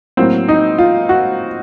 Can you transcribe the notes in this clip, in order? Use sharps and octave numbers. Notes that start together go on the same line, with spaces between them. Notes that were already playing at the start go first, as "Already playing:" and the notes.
A2 F#3 A#3 C4
D#4
F4
F#4